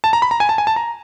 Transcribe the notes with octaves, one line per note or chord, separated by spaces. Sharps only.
A5
A#5
B5
A#5
G#5
A5
G#5
A5
A#5